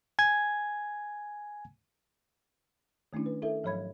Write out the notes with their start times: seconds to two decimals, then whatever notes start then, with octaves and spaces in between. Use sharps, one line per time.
0.19 G#5 G#6
3.13 D#3 A3 C#4 D4 E4
3.26 B4
3.42 E4 A4 A#4 E5
3.63 G#2 F3 F#3 C#5 B5 G#6